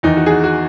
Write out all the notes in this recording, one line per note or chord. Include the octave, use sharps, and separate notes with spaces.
E2 D#3 D#4
F#4
G#4
F#4
F#4